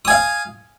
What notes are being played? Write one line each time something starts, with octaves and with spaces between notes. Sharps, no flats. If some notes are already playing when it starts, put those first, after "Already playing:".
F5 G#5 D#6